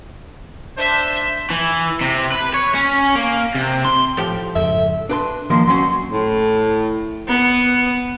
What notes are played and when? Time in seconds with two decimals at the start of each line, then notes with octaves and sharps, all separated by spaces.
0.78 D4 C5 E5
1.50 E3
2.01 C3
2.32 B4
2.54 C#5
2.75 C#4
3.15 A#3
3.55 C3
3.85 C6
4.17 A2 F3 G4
4.55 F2 G#2 C#3 A4 E5
5.09 D4 B4 C6
5.50 D#3 F3 A#3 C6
5.68 F#3 C#4 C6
6.12 A2
7.27 B3